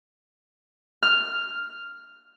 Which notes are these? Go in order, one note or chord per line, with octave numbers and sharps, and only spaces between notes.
F6